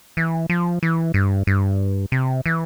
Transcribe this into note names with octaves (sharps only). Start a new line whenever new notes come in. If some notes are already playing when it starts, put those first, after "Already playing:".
E3
F3
E3
G2
G2
C3
E3